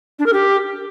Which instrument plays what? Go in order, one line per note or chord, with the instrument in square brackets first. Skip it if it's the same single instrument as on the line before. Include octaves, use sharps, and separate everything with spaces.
[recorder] D4
A#4
G4